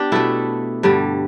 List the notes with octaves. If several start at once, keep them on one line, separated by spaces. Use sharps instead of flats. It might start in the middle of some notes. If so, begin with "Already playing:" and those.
Already playing: B3 D4 G4
B2 A3 E4 A4
G2 D3 G3